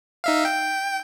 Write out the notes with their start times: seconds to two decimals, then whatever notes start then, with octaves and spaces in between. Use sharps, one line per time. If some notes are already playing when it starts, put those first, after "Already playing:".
0.24 D#4 E5 F5
0.45 G5